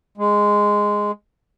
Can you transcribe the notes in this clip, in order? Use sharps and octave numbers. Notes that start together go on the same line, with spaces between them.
G#3